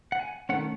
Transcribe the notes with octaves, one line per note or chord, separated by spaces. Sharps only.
F#5
G#5
D#3 A3 C#4 F#5